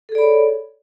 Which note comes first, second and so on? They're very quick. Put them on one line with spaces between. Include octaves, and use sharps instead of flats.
A4 G#4 D5 B5 C#5